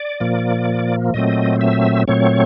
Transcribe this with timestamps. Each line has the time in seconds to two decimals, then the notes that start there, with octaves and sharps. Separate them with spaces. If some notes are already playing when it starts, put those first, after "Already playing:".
Already playing: D5
0.20 A#2 F3 A#3
1.14 A#2 F#3 A3 C4 D#5
1.61 E5
2.08 A#2 F#3 A3 C4 C#5